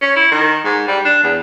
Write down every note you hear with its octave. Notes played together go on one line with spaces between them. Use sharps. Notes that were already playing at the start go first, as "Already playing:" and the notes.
C#4
E4
D#3
G#2
G3
D4
E2